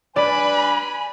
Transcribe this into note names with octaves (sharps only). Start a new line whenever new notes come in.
G3 D4 B4 D5 G#5 B5